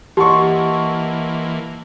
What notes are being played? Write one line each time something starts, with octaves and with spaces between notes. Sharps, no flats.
E3 A#3 G4 D#5 F#5 A5 C6 C#6